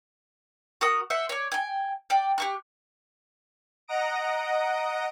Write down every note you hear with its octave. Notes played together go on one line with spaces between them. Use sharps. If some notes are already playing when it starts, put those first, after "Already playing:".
F#4 A#4 F#5 D#6
C5 E5 F#5
C#5 D5
G5 G#5
D5 G5
G4 C#6 F#6
D#5 F#5 A#5 D#6 A#6 D7